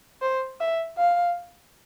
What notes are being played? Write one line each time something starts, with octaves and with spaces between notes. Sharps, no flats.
C5
E5
F5